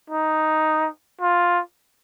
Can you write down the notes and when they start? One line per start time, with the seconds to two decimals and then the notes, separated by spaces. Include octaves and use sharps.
0.10 D#4
1.21 F4